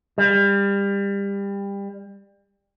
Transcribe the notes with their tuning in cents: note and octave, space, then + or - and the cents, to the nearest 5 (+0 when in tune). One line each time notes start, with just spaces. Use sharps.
G3 +25